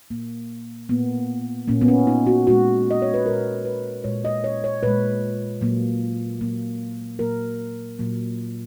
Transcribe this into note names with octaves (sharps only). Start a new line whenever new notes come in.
A#2 A#3
A#2 A#3 B3
A#2 A#3 C#4
B3
C#4
D#4
F#4
A#2 G#3 F#4
D#5
C#5
B4
A#2 G#3 A#4
B4
A#2 G#3 C#5
D#5
C#5
C#5
A#2 G#3 B4
A#2 F#3 A#3
A#2 F#3 A#3
A#2 F#3 A#3 A#4
A#2 F#3 A#3